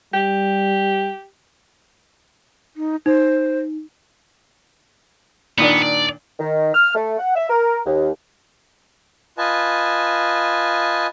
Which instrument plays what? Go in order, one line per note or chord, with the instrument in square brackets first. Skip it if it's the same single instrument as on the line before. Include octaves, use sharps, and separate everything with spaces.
[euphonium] G3 [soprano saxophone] G4
[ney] D#4
[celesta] D#4 [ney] C5
[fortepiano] A#2 D#3 D4 [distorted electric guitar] B3
[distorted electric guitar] D5
[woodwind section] D#3
F6
A3
F#5
E5
A#4
D#2
[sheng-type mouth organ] F4 B4 D#5 G#5 A5